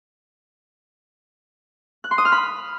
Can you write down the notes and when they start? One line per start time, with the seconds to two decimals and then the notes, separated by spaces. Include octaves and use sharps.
2.04 F#6
2.11 C6
2.18 D#6
2.25 F6
2.32 B5